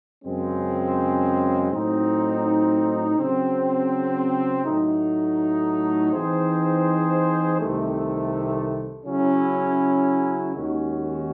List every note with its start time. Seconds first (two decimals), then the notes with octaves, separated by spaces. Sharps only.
0.24 F#2 C#3 G#3 C4
1.71 A2 F#3 C4 D#4
3.18 C#3 F#3 C4
4.65 A2 F#3 A3 D#4
6.12 E3 C4 D#4 G#4 C5
7.59 C2 C3 D#3 A3
9.06 C#3 F#3 C#4 E4
10.53 D#2 D#3 G#3 C#4 F#4